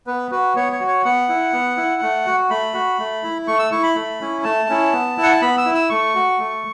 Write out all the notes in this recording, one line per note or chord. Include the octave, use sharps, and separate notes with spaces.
B3 B4
F#4 B4
B3 C#5
C#5
F#4
C#5
B3 F#5
E4
B3
E4
A3
F#4
A3 B5
F#4
A3
E4
A3 C#6
E6
E4 C#6
B5
A3
C#4 E4
A3 A5
C#4 E4
B3
E4
F#5
A5
B3 B5
E6
E4
E6
A3 C#6
F#4
A3